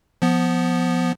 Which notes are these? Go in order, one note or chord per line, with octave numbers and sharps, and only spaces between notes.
F3 B3